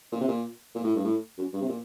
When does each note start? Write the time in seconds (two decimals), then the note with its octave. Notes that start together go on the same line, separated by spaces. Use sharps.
0.12 A#2
0.21 C3
0.28 A#2
0.75 A#2
0.84 A2
0.95 G2
1.04 A2
1.38 F#2
1.53 G2
1.61 C3
1.69 A#2